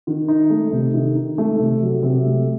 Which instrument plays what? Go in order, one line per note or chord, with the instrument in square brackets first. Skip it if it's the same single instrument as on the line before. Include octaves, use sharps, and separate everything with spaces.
[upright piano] D#3
D#4
A3
C3
D#3
D#4
A3
C3
F#3
C3
A3